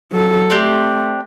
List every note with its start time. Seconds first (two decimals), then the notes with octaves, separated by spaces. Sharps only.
0.12 F#3 A4
0.50 A3 C4 D4 G4